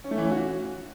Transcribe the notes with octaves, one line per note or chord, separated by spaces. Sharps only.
C#4
A3
E3
C#4
F#4